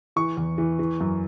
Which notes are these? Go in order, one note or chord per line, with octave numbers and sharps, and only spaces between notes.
E3 C#6
E2
E3
E3
F#2